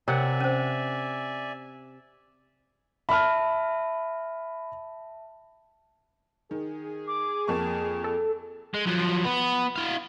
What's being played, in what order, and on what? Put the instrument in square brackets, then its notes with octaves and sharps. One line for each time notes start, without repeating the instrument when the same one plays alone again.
[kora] C3 F#5 [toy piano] A#4 C#5 [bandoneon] D5 E5 G#5
[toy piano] C#4 C5
[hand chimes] E5 A5 [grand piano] B5 F6
[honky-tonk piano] D#3 [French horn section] G#4
[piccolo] D6
[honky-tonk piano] F2 A#3 C#6 [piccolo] A5
[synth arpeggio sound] A4
[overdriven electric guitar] G#3
F3 F#3
B3
E4 F5